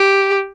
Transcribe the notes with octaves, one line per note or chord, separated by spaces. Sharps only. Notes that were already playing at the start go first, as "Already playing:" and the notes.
Already playing: G4